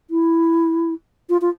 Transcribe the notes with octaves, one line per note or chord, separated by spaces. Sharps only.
E4
F4
F4